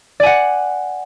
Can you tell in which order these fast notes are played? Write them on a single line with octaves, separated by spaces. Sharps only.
D5 G#5 F#5